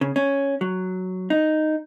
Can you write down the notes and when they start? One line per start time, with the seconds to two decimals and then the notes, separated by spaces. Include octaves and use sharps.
0.01 C#3
0.16 C#4
0.61 F#3
1.30 D#4